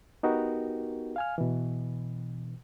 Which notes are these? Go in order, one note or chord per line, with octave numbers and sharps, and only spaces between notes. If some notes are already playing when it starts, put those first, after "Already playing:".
B3 D#4 F#4 G4 A#4
F5 G#5 F6
B2 E3